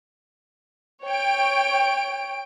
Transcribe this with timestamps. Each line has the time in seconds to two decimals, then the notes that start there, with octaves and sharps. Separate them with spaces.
1.06 C#5 G5 D7